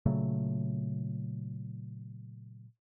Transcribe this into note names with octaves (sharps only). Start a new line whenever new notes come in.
A#2 C#3 F#3 A3